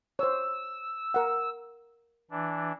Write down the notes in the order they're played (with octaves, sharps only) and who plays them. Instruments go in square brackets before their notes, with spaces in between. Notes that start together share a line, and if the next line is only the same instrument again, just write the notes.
[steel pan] C5 C#5 [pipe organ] E6
[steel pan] A#4 F#5
[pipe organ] E3 D4